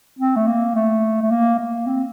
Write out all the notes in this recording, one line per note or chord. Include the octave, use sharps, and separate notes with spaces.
C4
A3
A#3
A3
A3
A#3
A#3
C4